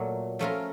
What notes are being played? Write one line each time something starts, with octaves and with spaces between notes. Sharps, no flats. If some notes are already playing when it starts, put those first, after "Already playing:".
Already playing: A#2 F#3 A3
F3 A3 C#4 F4 A#4